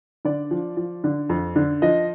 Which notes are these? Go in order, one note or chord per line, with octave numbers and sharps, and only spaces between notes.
D3 D5
F3
F3
D3
F2
D3
F3 D#5